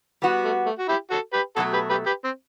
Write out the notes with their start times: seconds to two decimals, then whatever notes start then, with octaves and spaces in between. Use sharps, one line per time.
0.22 G3 B3 F#4
0.44 A3
0.66 A3
0.79 F#4
0.88 E4 G4
1.11 F#4 A4
1.33 G4 B4
1.56 B2 F#3 A3 F#4 A4
1.73 G4 B4
1.90 G4 B4
2.06 G4 B4
2.24 C4